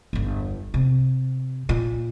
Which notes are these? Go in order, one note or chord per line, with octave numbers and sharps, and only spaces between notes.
G1 E2
C3
A#2